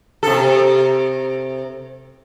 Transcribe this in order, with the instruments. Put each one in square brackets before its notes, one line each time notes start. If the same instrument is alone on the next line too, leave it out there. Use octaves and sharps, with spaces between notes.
[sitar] C3 A4